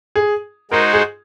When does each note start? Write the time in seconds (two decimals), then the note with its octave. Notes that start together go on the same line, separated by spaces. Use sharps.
0.15 G#4
0.71 G#3 D#4 F#4 A#4 C5
0.93 G#4